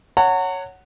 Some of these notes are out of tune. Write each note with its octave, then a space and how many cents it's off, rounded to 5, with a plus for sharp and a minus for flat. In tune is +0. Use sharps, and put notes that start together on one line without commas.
C#5 +0 F#5 +0 A#5 -40